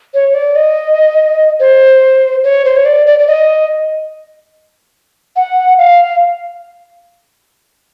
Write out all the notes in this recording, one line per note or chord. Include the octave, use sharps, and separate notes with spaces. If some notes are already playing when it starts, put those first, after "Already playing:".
C#5
D5
D#5
C5
C#5
C5
C#5
D5
D5
D5
D#5
F#5
F5